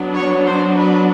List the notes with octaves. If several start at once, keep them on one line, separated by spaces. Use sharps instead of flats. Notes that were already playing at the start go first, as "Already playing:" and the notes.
Already playing: F#3 B3 D4
C#5
C5
B4